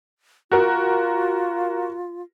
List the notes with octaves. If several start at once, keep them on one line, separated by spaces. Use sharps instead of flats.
F4 F#4 A#4